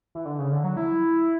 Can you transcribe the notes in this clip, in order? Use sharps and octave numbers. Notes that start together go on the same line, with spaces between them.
E3
D3
C#3
D3
F#3
E4